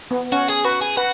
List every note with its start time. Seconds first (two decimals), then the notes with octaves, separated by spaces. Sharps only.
0.11 B3
0.32 C#4 F#4
0.48 G#4
0.64 F#4 B4
0.81 G#4
0.97 F#4 B4